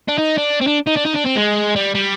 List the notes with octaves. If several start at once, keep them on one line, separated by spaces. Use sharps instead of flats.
D4
D#4
D4
C4
D4
D#4
D4
D#4
D4
C4
G#3
G3
G3